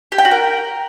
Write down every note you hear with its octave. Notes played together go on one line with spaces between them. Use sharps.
G4
G5
F#4
A#4